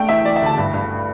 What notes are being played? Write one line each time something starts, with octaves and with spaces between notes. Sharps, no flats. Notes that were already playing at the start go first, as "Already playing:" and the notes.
Already playing: A3 D4 G5
E3 E5
E3 D5
E5
D2 A5
G2
G2